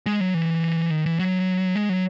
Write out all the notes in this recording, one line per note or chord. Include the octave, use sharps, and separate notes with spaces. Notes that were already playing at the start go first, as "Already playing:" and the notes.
G#3
F#3
E3
D#3
E3
F#3
G#3
F#3